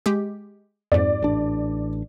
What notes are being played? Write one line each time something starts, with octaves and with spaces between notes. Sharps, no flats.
G#3 G4
F2 G#2 D5
A1 D4